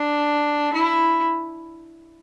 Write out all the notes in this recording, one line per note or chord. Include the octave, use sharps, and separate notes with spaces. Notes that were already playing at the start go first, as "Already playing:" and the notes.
Already playing: D4
E4